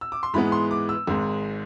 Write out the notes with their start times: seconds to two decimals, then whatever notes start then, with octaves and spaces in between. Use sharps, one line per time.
0.01 E6
0.12 D6
0.23 C6
0.34 G#2 E3 G#3 B3 B5
0.52 C6
0.71 D6
0.89 E6
1.07 G#1 G#2 G#3